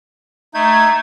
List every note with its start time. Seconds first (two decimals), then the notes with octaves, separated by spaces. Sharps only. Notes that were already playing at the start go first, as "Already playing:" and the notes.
0.54 A3 D#4 G6 G#6